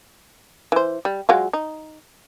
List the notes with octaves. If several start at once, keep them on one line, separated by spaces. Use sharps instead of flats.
E3 C5
G3
F#3 G#3 F4
D#4